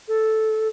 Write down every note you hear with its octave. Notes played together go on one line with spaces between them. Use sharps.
A4